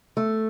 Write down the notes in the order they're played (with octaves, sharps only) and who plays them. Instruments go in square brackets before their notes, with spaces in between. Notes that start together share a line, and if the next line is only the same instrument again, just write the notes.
[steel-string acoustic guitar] A3